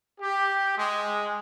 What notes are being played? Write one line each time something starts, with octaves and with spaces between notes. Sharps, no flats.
G4
G#3